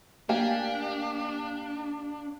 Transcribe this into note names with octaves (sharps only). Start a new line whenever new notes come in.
A#3 D4 G4 F5 G#5